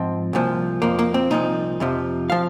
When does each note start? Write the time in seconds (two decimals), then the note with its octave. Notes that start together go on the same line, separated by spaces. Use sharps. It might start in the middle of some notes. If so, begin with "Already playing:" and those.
Already playing: G#2 F3 C4
0.33 C2 A#2 F3
0.82 F2 F3 A#3
0.99 A#3
1.14 C4
1.30 C2 A#2 F3 D#4
1.80 F2 C3 F3
2.30 F3 F5